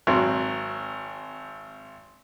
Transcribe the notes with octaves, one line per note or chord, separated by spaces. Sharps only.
G#1 F#3 C4